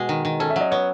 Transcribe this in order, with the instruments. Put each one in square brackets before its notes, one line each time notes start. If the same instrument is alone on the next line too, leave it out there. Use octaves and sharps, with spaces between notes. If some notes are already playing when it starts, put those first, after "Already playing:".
Already playing: [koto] B2 G#3 [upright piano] F#4
[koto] D#3
D#3
[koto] C#4 [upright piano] A4
[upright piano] E5
[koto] F#3 [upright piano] D#5
[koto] B3 [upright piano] C#5